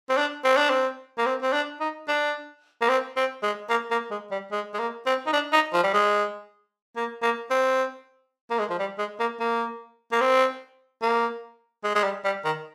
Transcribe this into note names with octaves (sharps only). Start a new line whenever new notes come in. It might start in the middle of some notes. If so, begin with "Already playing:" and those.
C4
D4
C4
D4
C4
A#3
C4
C4
D4
D#4
D4
A#3
C4
C4
G#3
A#3
A#3
G#3
G3
G#3
G#3
A#3
C4
D#4
D4
D#4
F3
G3
G#3
A#3
A#3
C4
A#3
G#3
F3
G3
G#3
A#3
A#3
A#3
C4
A#3
G#3
G#3
G3
G3
D#3